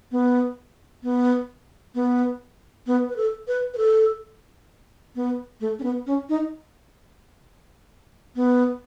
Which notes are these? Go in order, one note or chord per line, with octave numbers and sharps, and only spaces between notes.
B3
B3
B3
B3
B4
A4
B4
B4
A4
B3
A3
C#4
B3
C#4
D#4
B3